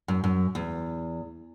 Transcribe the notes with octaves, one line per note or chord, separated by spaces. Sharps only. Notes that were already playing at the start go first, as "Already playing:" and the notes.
F#2
F#2
E2